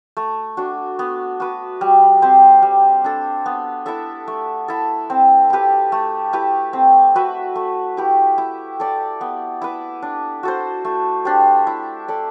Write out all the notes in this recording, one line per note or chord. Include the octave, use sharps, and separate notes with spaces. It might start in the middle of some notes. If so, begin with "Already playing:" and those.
A3
D4 F#4
B3
F#4 B4
G3
C4 G4 C5
G3
D4 A4
B3
E4 A4 E5
A3
E4 A4
C4
E4 G4 B4
A3
E4 G4 B4
C4
F#4 B4 E5
A3
E4 G4 B4
E4
A4 D5
B3
E4 B4
D4
F#4 A4 C5
A3
D4 G4 C5
E4
A4 D5